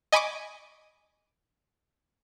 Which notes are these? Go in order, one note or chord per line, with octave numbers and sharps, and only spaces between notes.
D#5 G#5 B5 C#6 D6